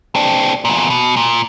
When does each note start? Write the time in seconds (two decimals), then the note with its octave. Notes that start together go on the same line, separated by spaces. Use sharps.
0.15 C4 D4
0.65 E2 A#2
0.90 B2
1.17 A#2